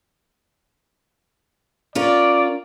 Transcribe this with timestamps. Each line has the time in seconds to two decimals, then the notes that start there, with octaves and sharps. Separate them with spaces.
1.95 C#4 F4 A#4 D5